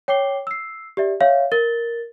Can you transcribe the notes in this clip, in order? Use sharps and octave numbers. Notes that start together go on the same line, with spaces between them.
C#5 G5 D6 C7 G7
E6 C7
G4 D5 E5
C#5 E5 F5
A#4 A6 G7